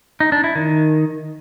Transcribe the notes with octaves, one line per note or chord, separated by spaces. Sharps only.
D#4
D4
E4
D#3